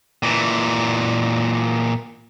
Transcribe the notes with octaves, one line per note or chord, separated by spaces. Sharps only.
A#2 E3